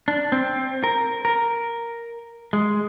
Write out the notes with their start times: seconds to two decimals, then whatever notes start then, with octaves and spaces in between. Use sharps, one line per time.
0.08 D4
0.32 C4
0.84 A#4
1.25 A#4
2.53 G#3